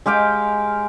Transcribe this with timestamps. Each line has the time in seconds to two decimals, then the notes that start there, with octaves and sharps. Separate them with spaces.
0.06 G#3 G4 F5 G5